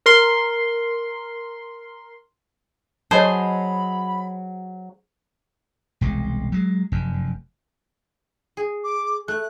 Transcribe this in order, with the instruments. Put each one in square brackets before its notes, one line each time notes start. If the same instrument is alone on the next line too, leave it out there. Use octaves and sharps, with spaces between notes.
[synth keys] A#4 C6
[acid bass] F#3 [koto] G#4 C5 [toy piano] C#5 D#5 A5 [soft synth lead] B5
[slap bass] E1 C2 G#3
F#3 G#3
F1 F#2
[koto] G#4
[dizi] D6
[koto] A3 [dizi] F#6